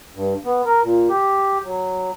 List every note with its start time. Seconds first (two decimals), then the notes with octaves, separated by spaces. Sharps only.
0.15 G2
0.45 B3
0.65 A#4
0.84 A#2
1.09 G4
1.64 F#3